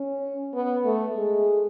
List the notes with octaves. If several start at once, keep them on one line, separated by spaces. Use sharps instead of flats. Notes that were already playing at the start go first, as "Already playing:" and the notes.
Already playing: C#4
B3
A3
G#3